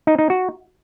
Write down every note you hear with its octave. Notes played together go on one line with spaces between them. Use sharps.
D#4
D#4
F#4